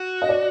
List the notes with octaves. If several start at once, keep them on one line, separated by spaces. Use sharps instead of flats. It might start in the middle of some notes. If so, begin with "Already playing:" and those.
Already playing: F#4
D#5
D5